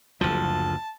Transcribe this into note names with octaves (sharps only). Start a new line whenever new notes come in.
F#1 D2 F3 A5